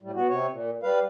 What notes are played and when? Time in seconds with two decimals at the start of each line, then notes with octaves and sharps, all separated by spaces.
0.02 A2 G3
0.15 B3 F#4
0.29 C3 C#5
0.51 A#2
0.83 G3 B4 F5